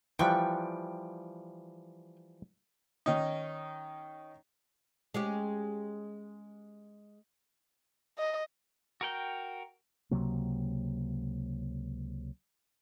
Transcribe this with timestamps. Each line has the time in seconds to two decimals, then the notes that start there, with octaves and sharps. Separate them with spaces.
0.19 E3 F3 G3 G5 C#6 F#6
3.06 D#3 C#4 D#4
5.14 G#3 C#4 G4
8.18 D#5
9.01 F#4 A#4 G5
10.11 C#2 C3 F#3 A#3